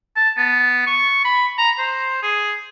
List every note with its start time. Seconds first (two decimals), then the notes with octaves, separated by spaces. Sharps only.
0.16 A5
0.38 B3
0.87 C#6
1.25 B5
1.58 A#5
1.79 C5
2.23 G#4